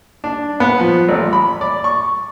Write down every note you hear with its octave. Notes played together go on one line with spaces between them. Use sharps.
D4
B3
F3
A1
B5
D5
C#6